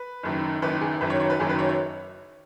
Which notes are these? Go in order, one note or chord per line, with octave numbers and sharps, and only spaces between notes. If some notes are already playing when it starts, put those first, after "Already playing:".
Already playing: B4
F#1 F#2 D#3
F#1 F#2 D#3 B4
G#4
F#1 F#2 D#3 F#3 B4
C#5
C#5
B4
F#1 F#2 D#3 F#3 G#4
B4
C#5
C#5